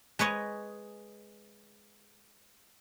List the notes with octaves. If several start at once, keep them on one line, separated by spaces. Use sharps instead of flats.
G#3 B4 C#5 D#5